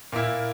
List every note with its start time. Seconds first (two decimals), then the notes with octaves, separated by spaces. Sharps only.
0.12 A#2 A#3 E4